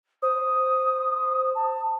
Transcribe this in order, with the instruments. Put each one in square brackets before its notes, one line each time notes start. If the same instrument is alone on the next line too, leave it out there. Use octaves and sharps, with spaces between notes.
[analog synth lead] C5 [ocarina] D#6
[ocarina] A5